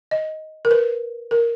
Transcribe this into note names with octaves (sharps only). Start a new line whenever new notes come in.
D#5
A#4
B4
A#4